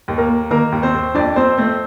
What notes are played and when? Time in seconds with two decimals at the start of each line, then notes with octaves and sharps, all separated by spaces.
0.08 D#2
0.18 A#3 A#4
0.29 A#3
0.51 D#3 A#3 A#4
0.72 D#2
0.83 C4 C5
0.94 D#2
1.15 F2 D4 D5
1.36 F2 C4 C5
1.58 A3 C4 C5